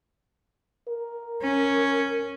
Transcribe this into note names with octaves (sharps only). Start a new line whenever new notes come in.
A#4
C#4